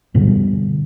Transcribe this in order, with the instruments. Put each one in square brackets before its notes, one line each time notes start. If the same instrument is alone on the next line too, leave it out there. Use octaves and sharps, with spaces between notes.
[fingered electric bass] G2 B2 D3 G3